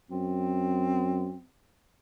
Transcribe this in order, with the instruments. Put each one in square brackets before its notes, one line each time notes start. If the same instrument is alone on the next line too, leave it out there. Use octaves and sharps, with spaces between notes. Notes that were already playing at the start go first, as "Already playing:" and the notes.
[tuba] F#2 [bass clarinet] C4